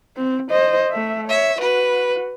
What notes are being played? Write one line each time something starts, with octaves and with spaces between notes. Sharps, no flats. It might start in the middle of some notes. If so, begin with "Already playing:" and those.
C4
C5 D#5
A3 E5
C#5 E5
F#4 B4